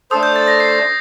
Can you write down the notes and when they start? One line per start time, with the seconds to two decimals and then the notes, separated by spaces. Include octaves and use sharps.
0.11 A3 D4 A4 C5 D#6
0.23 G6
0.36 A6
0.48 A#6
0.60 C7